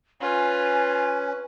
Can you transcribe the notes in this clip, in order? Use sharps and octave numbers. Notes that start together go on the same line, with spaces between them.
C#4 F4 B4 G#5